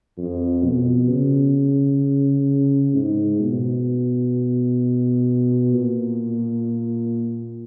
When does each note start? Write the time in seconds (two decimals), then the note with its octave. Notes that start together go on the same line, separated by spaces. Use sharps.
0.18 F2
0.64 B2
1.10 C#3
2.95 G#2
3.41 B2
5.73 A#2